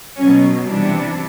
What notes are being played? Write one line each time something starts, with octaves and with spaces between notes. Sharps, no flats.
B2 F#3 C#4
C3 E3 G3 D4